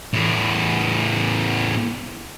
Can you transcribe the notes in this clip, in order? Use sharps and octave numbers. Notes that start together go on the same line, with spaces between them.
E2 A2